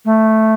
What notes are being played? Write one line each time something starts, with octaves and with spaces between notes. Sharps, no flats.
A3